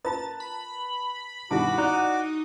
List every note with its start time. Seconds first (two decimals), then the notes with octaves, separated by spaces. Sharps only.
0.05 F4 A#4 B4 A5 A#5 A6
0.40 B5
1.51 G2 B2 D#3 E4 F#4 G#4 A5 D6
1.78 D#4 D5 F#5 A#5 F#6